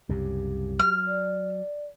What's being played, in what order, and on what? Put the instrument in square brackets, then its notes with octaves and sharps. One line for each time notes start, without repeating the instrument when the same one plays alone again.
[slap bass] C2 F#2 C#3 [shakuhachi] G4
[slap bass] F#3 [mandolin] F6
[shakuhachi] D5